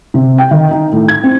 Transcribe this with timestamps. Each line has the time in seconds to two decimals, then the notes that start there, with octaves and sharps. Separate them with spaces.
0.14 C3
0.38 G5
0.51 D#3
0.71 D#4
0.92 A2
1.08 G#6
1.24 C4